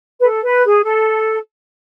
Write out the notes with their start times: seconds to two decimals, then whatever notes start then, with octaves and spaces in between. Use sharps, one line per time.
0.20 B4
0.23 A4
0.44 B4
0.64 G#4
0.84 A4